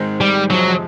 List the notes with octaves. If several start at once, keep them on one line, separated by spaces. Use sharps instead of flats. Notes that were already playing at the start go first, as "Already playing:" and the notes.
Already playing: G#2 D#3 G#3 C4 D#4
G3
F2 C3 F3 F#3 G#3